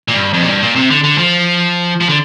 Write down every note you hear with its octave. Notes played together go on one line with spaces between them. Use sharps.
A#2
G2
F2
A#2
G2
A#2
C3
D3
D3
F3
F3
D3